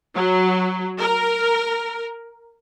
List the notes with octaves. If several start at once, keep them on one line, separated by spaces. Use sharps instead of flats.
F#3
A#4